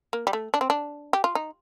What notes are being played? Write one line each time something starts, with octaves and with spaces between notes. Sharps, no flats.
A#3
G3
A3
D4
C4
D4
G4
F4
D#4